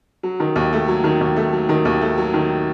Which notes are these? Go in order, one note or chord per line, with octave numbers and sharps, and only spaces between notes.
F#3
D#3
D#2
A3
F#3
D#3
D#2
A3
F#3
D#3
D#2
A3
F#3
D#3